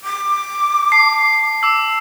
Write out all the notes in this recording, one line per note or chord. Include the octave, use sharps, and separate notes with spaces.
D6
A5 C7
D6 E6 C7